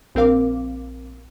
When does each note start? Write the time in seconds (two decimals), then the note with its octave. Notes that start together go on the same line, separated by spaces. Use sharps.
0.15 A#1 C4 A#4 F5 D6